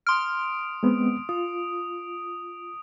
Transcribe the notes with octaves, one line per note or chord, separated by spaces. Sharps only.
C6 D#6 F6 D7
G#3 B3 C4
F4 D#6